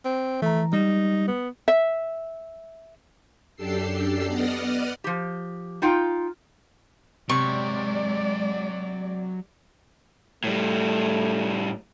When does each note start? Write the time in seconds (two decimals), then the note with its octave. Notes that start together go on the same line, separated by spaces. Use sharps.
0.05 C4
0.42 E3 A3 A#5
0.73 G3 D#4 G4
1.28 B3
1.68 E5
3.56 F#2 D4 G4 A4 E6 C7
4.27 B3 D5 D#5 F#5 D#6 F6
5.04 F3 G4
5.82 D#4 F4 G5
7.29 C3 F#3 G#3 D5 E5 C#6
10.44 A2 G3 A3